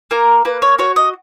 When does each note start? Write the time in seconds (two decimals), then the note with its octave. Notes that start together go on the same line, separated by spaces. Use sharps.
0.11 A#3 A#4
0.45 A#3 B4
0.62 C#5
0.79 F#4 C#5
0.96 D#5